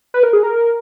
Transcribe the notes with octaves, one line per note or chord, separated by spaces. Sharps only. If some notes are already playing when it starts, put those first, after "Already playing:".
B4
A#4
G#4
A#4